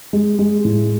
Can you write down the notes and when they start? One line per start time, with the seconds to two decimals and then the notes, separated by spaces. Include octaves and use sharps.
0.13 G#3
0.39 G#3
0.65 A2